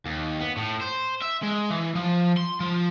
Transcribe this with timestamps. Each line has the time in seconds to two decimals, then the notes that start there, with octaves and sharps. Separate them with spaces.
0.06 D#2
0.40 B3
0.57 A2
0.81 C5
1.22 E5
1.43 G#3
1.70 E3
1.95 F3
2.37 C6
2.60 F3